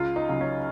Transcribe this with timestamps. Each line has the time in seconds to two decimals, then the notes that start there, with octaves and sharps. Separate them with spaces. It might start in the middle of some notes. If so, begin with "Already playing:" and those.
Already playing: C#2 F4
0.16 D#4
0.29 C#3 F#3
0.41 C#4